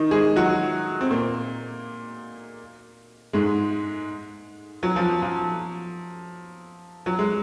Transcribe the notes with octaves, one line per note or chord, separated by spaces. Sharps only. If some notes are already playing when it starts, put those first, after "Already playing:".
Already playing: D#3 D#4
G#3 G#4
F#3 F#4
C4
A#2 A#3
G#2 G#3
F#3
F3
F3
F#3
G#3